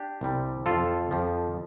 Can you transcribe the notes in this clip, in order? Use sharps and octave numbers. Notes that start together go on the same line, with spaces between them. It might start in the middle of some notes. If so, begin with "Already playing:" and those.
Already playing: D4 G4
C2 C3 G3
F2 F3 F4 A4
F2 F3